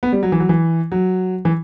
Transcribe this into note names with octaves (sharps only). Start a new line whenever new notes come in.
B3
G3
F#3
E3
F#3
E3
F#3
E3